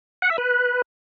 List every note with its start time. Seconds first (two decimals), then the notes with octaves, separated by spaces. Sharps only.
0.22 F#5
0.30 E5
0.38 B4